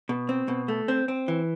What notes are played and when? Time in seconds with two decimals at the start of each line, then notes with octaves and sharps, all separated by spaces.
0.09 B2
0.29 C4
0.48 B2
0.68 A3
0.88 C4
1.08 C4
1.28 E3